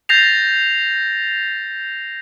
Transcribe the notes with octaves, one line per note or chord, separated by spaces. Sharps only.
G6 A6 A#6 C7 F7